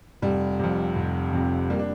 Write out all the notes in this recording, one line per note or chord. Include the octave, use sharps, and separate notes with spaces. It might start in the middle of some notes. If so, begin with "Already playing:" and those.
F1 G3
F2 C3
F1
F2 C3
G3 A#3
D4